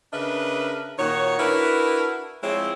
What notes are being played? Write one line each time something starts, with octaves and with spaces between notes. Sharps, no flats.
C#3 D4 A#4 B4 D#5 E5
A#2 D#3 F#4 C#5
D4 E4 F#4 A#4 B4
F3 G#3 C4 E4 G#4 C#5